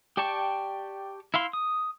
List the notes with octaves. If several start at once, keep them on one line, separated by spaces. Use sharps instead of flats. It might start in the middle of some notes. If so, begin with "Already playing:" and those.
G4 D5 G5 A5 C#6
E4 E5 F5 C6
D#6